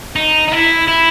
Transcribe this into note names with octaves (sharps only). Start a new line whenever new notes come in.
D#4
D#4
E4
E4